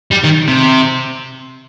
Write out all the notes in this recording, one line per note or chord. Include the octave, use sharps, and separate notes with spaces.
G3
D#3
C3